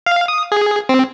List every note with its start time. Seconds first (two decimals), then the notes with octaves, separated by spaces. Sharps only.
0.07 F5
0.28 D#6
0.52 G#4
0.89 C4